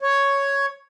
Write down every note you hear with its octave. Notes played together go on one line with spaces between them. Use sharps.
C#5